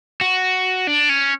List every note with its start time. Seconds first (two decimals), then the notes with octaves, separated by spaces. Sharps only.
0.21 F#4
0.87 D4
1.09 C#4